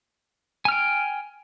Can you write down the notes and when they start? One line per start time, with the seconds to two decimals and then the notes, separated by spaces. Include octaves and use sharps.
0.65 G#5
0.68 F6
0.72 G5